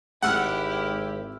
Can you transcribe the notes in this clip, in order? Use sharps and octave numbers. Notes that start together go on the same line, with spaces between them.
G#1 G#3 E4 G4 F#5 E6 F6